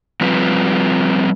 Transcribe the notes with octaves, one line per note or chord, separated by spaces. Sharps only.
F3 G3 C4 F4 B4